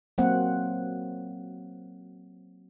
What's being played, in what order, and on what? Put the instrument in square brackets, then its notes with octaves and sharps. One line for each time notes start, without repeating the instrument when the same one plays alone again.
[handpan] F#3 A#3 C4 F#5